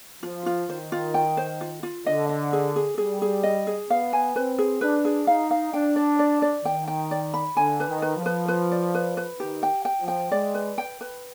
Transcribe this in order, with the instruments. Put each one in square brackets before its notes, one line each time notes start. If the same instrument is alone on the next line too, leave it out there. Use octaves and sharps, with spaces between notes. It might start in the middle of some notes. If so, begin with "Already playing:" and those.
[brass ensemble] F3 [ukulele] F4
[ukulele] F4
[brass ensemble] D#3 [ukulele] C5
[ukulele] F4
G5
C5
F4
F4
[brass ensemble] D3 [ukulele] D#5
[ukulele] D#5
G#4
G#4
[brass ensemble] G3 [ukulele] G#4
[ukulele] G#4
D#5
G#4
[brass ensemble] B3 [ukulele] F5
[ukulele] G#5
[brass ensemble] C4 [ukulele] B4
[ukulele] G#4
[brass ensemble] D4 [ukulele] B4
[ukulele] G#4
[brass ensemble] D#4 [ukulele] F5
[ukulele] F5
[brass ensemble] D4 [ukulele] G5
[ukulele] D5
D5
D5
[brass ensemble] D#3 [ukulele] G5
[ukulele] G5
D5
B5
[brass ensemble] D3 [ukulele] G#5
[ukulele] B4
[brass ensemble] D#3
[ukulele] B4
[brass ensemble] F3
[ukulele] B4
B4
D5
B4
B4
[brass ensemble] D#3 [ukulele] G4
[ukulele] G5
G5
[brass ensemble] F3
[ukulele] G5
[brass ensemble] G#3 [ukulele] D5
[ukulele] B4
G5
B4